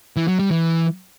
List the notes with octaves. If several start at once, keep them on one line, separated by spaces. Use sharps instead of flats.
E3
F#3
G3
E3